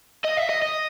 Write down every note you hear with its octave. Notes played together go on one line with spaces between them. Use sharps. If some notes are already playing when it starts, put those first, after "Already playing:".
D#5
E5
D#5
D#5